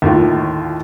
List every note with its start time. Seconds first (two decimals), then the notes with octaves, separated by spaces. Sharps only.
0.02 D#2 A2 F4